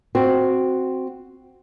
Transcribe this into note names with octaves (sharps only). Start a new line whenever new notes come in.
C4 F#4